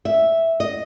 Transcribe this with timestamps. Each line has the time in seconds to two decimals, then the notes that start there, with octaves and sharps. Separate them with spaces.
0.05 E5
0.60 D#5